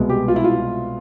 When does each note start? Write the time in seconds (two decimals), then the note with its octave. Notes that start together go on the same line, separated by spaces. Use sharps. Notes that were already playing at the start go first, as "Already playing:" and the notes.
Already playing: C2 B2 G#3 B3
0.10 G4
0.28 F4
0.36 E4
0.44 F4